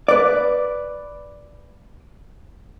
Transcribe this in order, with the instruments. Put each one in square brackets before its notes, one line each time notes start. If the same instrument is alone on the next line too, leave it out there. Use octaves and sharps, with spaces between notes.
[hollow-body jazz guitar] B4 D5